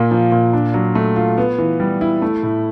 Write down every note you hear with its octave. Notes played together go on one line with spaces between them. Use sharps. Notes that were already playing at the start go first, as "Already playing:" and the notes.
Already playing: A#2 A#3
F3
A#2
D4
F#3
A3
F4
B3
E3
G3
E4
A3
A2